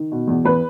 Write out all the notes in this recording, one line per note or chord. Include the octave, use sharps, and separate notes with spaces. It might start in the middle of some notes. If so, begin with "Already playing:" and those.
Already playing: D#3
B2
E2
E2 B4